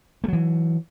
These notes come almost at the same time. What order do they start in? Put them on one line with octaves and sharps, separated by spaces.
A3 F#3 E3